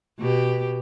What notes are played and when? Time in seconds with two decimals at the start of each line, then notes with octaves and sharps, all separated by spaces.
0.19 B2 G4